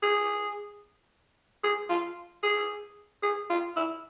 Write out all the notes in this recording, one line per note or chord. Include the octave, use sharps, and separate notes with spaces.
G#4
G#4
F4
G#4
G#4
F4
E4